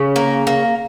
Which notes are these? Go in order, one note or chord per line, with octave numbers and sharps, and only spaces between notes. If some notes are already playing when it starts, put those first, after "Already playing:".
Already playing: C#3 C#4
A#3
A#3